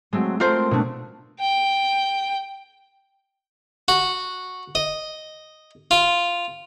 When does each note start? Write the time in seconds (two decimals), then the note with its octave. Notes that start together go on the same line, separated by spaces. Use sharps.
0.13 F#3 G#3 A3 C4
0.40 A3 C4 F4 A#4 C5
0.71 B2 A3 D4
1.41 G5
3.88 F#4
4.75 D#5
5.91 F4